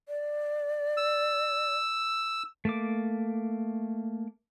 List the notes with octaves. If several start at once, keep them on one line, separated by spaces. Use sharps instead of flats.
D5
E6
A3 A#3 D6